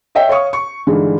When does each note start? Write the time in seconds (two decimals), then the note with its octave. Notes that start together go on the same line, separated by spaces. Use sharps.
0.15 C#5 D#5 E5 G5
0.29 C#5 F5 C#6 D#6
0.53 C#6
0.87 G2 D3 E3 G#3 D#4 F4